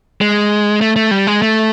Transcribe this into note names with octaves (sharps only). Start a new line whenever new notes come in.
G#3
A3
A3
G3
G#3
A3